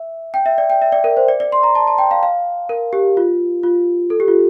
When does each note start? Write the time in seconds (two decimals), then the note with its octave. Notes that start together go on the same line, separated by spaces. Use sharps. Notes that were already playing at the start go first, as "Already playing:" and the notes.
Already playing: E5
0.34 G5
0.46 E5
0.58 D5
0.70 G5
0.82 E5
0.92 D5
1.04 A#4
1.17 C5
1.28 D5
1.40 D5
1.52 C6
1.63 A#5
1.75 A5
1.87 A5
1.98 G5
2.11 F5
2.23 F5
2.69 A#4
2.93 G4
3.17 F4
3.63 F4
4.10 A4
4.20 G4
4.28 F4